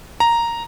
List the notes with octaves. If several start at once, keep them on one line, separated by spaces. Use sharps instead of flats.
A#5